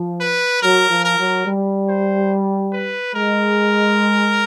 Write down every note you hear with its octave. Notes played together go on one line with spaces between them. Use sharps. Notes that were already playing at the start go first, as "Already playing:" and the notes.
Already playing: F3
B4
F#3 A#4
F3
A#4
F#3
G3
C5
B4
G#3 A#4